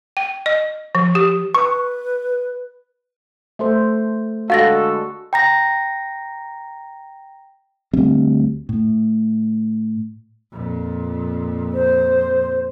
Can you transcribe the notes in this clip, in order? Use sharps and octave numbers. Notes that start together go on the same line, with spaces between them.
G5
D#5
F3
G4
B4 C#6
A3 A4 C5
D3 G#3 F#4 A4 F5 A6 A#6
G5 A#5 A#6
D2 G3 C4
A2
F2 A#2
C5